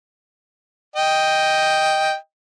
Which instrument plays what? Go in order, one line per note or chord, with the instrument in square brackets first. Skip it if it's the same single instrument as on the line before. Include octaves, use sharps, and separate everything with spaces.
[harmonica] D#5 G5